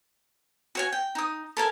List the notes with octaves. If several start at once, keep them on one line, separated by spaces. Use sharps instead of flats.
F#4 C#5 G#5
G5
D#4 D#6
A4 A#4 G#5 A5